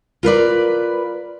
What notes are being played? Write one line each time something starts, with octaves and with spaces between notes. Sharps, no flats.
F4 A#4 B4 D5